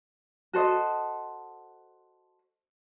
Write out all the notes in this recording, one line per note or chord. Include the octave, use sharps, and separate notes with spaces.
F#4 A4 C5 D#5